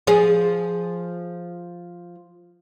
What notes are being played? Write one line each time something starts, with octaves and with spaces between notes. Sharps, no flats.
F3 G#4